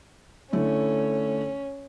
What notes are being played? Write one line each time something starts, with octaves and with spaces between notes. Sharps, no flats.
D3 A3 C#4 E4